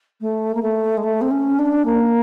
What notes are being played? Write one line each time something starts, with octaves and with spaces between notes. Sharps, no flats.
A3
A#3
A3
G#3
A3
C4
C#4
D4
A#3